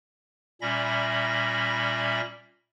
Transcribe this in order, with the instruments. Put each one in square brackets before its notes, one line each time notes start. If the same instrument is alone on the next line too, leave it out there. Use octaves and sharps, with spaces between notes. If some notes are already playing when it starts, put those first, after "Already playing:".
[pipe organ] A#2 G3 C#4 E5 B5 A#6